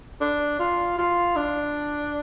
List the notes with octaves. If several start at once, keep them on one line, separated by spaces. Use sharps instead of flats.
D4
F4
F4
D4